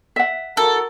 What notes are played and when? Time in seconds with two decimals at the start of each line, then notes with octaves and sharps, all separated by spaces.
0.16 E5 F#5
0.57 F#4 A4 A#4